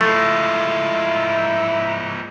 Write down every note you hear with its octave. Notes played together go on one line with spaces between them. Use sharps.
F3 G#3 A3 E4 F4